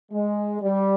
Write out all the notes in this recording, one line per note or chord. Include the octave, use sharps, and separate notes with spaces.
G#3
G3